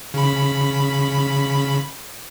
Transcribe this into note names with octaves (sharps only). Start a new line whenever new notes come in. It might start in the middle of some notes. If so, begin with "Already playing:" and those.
C#3 B5